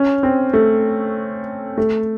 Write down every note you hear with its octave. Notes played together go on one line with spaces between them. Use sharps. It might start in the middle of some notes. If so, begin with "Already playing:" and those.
Already playing: C#4
C4
A3
A3